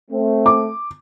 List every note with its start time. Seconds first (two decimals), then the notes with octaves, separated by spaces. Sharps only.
0.11 A3 C4
0.46 D6